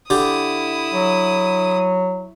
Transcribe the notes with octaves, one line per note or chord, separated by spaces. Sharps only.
D3 E4 G4 D#6
F#3